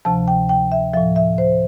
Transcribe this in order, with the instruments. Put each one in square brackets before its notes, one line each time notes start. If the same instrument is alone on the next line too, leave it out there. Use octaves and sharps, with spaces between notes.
[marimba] D2 C3 F3 A5
G5
G5
E5
A2 F3 E5
E5
C5